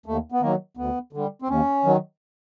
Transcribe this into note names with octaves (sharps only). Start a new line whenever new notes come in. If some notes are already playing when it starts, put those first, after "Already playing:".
D#2 A3
B3
D#3 F#3 A#3
D2 B3
D3 G3
C4
D#2 C#4
D#3 F#3